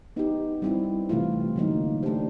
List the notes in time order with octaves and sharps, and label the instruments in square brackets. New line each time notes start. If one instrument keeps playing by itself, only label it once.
[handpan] B3 D#4 G4
G3 C4 E4
C3 E3 A3 C4 F4
D3 F#3 A#3 D#4
A3 D4 G4 C5